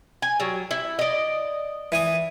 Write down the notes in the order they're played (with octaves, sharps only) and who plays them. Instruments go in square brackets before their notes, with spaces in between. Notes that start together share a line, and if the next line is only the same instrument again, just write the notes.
[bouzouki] G#5
F#3 G3
E4
D5 D#5
[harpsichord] E3 G#5 D#6